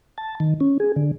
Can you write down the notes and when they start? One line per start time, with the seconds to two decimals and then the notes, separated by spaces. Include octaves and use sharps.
0.18 A5
0.40 D#3
0.60 C#4
0.80 G#4
0.96 D3